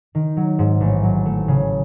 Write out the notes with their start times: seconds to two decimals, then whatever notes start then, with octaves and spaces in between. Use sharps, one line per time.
0.15 D#3
0.37 F#3
0.59 G#2
0.81 A1
1.03 F#3
1.26 A3
1.48 C#3